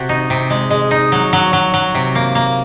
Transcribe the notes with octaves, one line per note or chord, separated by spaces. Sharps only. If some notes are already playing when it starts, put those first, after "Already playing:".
Already playing: C3 F#4
D#4
C3
G#3
G#3
D#4
F#3
F#3
F#3
F#3
C3
A#3
A#3